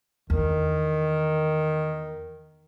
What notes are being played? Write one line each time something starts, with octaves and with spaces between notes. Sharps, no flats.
E2 D#3